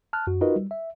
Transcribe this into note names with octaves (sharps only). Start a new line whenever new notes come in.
A5 F6 F#6
F#2 F#4
D#4 F4 F#4 A#4 B4 D#5
G3
E5